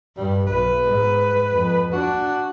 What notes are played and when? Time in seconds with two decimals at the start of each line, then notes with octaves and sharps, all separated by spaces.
0.17 G2 G3
0.47 B1 B4
0.84 G#2
1.52 F2
1.92 D4 F#4